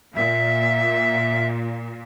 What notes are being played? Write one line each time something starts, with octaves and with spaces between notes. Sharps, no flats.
A#2 E5